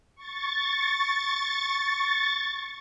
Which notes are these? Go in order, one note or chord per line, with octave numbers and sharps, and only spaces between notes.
C#6 A6